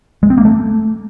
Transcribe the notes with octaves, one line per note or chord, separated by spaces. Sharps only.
G#3
C4
A#3
A3